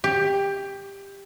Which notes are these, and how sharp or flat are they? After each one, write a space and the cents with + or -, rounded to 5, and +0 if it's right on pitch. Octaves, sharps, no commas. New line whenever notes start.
G4 +15